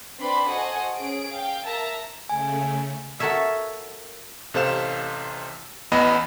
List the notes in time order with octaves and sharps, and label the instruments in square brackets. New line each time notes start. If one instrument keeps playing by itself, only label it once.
[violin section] C4 D4 B4 D5 B5 C6
F#4 A4 C5 D#5 F#5 G#5
C#4 G#4 D7
F5 G5
A#4 E5 A5 A#5
[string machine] C#3 A3 [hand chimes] G#5
[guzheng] F#4 A4 A#4 C#5 E5 F5
[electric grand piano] A1 C3 A4 C5 F5 E7
A1 E2 B3 D#5 B5